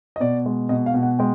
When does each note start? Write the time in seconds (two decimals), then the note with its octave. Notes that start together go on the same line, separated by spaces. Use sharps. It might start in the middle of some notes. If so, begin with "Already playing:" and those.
0.16 D#5
0.20 B2 D5
0.46 G#3
0.69 B2 D#5
0.86 F5
0.94 B2
1.03 F#5
1.19 G#3 G5